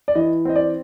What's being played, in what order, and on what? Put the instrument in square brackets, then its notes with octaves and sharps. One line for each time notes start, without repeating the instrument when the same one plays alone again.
[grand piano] D5
E3 D#5
C4 D#5
D5